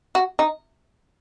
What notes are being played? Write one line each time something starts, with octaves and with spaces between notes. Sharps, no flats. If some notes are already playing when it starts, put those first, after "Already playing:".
F#4
D#4